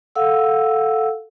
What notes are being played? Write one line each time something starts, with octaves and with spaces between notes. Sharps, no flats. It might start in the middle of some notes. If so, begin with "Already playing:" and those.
A4 F5 F#5 E6